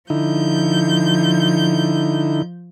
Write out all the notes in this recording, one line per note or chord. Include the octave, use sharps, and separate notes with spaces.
D3 F3 D#4 E4 G6